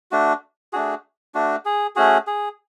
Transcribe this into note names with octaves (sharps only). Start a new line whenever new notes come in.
A3 D4 F#4
A3 D4 F#4 G#4
A3 D4 F#4
G#4
A3 C#4 F#4 G#4
G#4